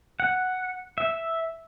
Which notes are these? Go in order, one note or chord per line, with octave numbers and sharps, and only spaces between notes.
F#5
E5